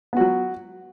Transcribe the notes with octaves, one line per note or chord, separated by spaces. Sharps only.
F#3 B3 F#4